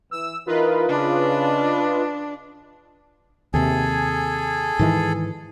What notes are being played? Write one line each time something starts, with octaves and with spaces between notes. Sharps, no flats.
E3 E6
E3 D#4 F4 A#4 B4 D#5
C#3 D4
D#2 C3 G#4 A4 G#5
G#2 D#3 E3